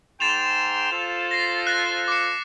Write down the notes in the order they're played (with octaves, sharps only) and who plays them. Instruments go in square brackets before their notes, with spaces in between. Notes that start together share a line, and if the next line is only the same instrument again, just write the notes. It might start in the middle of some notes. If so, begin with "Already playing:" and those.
[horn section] G#2 G5 C6 [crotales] A6 E7 F7
[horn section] F4 A4 C5
[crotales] A#6 C7
F#6 A#6
D6 C#7